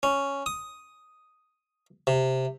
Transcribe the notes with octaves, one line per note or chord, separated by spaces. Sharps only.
C#4
D#6
C3